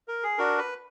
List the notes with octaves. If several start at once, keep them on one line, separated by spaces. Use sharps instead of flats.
A#4
G#4
D4 F#4 A#4
B4